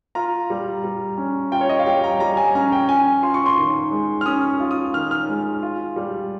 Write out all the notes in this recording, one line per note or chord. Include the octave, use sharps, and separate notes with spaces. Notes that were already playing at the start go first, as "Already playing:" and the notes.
F4 A#5
G3
G3
C#4
F4 G5
C#5
D#5
F5
G3 G5
A#5
G3 A#5
G#5
C#4 A#5
G5
C#4 G#5
F4 C6
C#6
C6
D#3
G#3
F6
C#4 D#6
F4
D#6
D#3 F6
F6
G#3
F4
G3